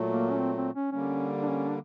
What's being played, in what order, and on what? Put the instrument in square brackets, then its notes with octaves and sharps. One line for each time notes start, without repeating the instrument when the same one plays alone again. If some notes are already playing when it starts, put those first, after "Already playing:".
Already playing: [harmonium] A#2 F#3 A3
[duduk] A#3
C#4
C4
C4
C#4
[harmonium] D3 G3 A#3 [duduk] C#4
[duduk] D4
C#4
D4